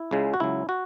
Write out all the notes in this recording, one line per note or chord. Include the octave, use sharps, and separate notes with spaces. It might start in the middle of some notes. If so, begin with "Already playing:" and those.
Already playing: E4
C#2 C#3 G#3
F#4
C#2 C#3 F#3 E4
F#4